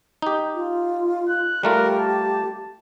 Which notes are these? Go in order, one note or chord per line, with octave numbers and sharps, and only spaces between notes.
D#4 G4
F4
F#6
G3 A3 F4 G4 A#4
A5